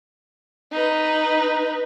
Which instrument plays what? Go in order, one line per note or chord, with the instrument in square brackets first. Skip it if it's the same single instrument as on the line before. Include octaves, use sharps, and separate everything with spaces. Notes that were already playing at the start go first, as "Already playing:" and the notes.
[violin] D#4 B4